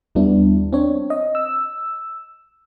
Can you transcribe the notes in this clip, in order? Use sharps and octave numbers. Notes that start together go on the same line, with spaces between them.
D#2 G3 B3 D4 E4
C4 D4 C#5
D#5
E6